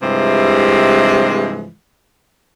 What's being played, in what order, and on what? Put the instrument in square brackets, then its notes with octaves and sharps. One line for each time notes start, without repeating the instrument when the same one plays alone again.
[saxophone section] G2 C3 E3 F3 G#3